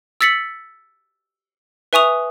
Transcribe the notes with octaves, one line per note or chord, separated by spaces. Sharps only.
E6 A6 B6 C#7 F#7
B4 E5 G#5 C#6 D#6 F7